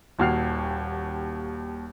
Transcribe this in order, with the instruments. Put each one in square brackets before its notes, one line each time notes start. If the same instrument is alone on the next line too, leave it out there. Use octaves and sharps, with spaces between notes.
[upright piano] D#1 D#2 F#4 F6 C7 F7